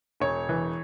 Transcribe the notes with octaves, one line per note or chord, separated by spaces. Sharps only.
E1 C#5
E3